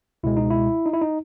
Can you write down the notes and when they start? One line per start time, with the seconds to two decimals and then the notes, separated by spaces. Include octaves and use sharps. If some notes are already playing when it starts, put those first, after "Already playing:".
0.23 C#2 B2 G#3 E4
0.37 D#4
0.50 E4
0.86 D#4
0.93 E4
1.01 D#4